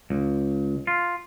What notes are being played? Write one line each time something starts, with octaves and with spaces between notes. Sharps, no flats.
C#2
F4